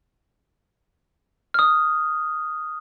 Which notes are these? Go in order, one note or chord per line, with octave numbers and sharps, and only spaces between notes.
D#6 F6